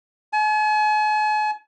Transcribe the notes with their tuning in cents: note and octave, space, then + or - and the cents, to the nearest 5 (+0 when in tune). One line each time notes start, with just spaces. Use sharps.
G#5 +45